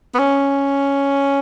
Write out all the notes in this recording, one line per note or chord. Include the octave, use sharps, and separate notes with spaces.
B3
C#4